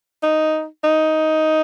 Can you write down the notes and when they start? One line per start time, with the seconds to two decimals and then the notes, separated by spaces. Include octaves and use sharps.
0.23 D#4
0.84 D#4